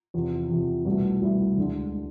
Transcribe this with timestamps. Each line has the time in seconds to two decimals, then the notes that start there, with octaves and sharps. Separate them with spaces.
0.14 E2 C3 F3
0.50 E2 C3 F3
0.85 C2 B2 A3 E4
1.22 C2 B2 A3 E4
1.58 D2 D3 G#3
1.93 G#3